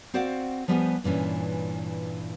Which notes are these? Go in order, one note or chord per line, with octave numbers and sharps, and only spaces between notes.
C4 F#4 C5 D5 F5 F#5
F3 G3 B3 G4 B4 G#5
G2 A#2 E3 C#4